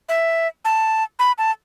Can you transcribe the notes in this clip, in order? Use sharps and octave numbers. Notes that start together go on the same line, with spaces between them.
E5
A5
B5
A5